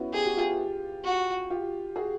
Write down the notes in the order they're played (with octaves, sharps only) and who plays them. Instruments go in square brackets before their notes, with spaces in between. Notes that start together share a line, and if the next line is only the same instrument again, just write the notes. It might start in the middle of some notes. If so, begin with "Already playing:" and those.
Already playing: [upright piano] B3 C#4 E4 F#4
[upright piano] G4 [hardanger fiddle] G#4
[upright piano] F#4
F4 G4
[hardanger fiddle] F#4
[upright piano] F4 G4
F#4 G#4